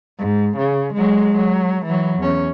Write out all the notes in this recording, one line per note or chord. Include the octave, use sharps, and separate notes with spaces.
G#2
C#3
F#3 G#3
F#3
E3 F#3
E2 C#4